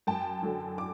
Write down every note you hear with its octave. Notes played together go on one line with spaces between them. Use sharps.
F#2 G5 A5
D3 F#3
D6